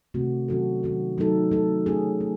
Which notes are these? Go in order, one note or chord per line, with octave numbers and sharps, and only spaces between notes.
C3 D#3 A3 C4 F#4
D#3 F#3 C#4 F#4 A4
D#3 F#3 C#4 F#4 A4
F#3 A3 D#4 A4
F#3 A3 D#4 A4
A3 C#4 G#4
A3